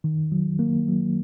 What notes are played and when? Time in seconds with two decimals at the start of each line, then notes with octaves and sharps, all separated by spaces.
0.04 D#3
0.32 F#3
0.59 A#3
0.88 F#3